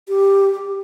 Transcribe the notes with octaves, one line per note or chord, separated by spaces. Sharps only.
G4